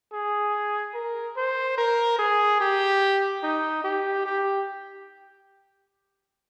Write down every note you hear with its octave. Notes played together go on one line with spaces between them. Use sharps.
G#4
A#4
C5
A#4
G#4
G4
D#4
G4
G4